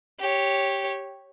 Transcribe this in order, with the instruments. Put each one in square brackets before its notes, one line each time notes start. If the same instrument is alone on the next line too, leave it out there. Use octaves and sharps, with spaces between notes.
[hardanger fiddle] G4 C#5